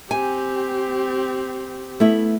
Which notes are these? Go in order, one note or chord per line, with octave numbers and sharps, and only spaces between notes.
C4 G4 G#5
A3 B3 E4